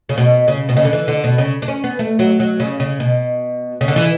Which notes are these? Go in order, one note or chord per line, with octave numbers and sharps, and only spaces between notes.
C#3
B2
C#3
B2
C#3
D3
E3
D3
B2
C#3
D4
C#4
B3
A3
F#3
F#3
C#3
C#3
B2
C#3
D3
E3